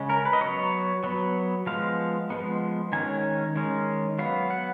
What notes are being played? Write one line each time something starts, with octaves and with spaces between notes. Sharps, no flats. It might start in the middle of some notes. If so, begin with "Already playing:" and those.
Already playing: C#3 G#3 C#4
A#4
B4
D#5
F#3 B3 C#5
F#3 B3
F3 G#3 B3 F5
F3 G#3 B3
D#3 G#3 C#4 G#5
D#3 G#3 C#4
F#3 B3 F5
F#5